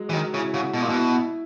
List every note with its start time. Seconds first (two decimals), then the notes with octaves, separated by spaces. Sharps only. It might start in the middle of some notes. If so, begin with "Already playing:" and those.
Already playing: F#3 G#3
0.09 E3
0.13 D#3 F#3
0.33 C#3 E4
0.54 C#3 F#4
0.74 B2 E4
0.82 A#2
0.89 B2 E4